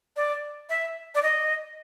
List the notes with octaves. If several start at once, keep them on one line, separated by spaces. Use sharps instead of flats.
D5
E5
D5
D#5